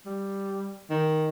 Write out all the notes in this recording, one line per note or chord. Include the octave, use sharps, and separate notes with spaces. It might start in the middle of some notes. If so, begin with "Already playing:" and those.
G3
D#3